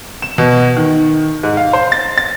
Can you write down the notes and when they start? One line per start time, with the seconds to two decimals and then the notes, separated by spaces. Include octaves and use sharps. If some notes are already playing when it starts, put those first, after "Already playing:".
0.22 E7
0.38 B2
0.77 D#3
1.43 G#2
1.57 F5
1.73 C5
1.92 A6
2.18 A6